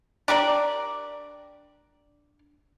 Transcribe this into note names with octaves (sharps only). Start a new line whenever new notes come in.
D4 G4 A#4 D5